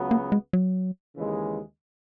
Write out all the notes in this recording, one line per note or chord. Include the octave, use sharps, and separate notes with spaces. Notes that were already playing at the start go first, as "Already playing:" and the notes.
Already playing: C#2 C#3 F#3 B3 F#4
A#3
G#3
F#3
D#2 C#3 E3 G#3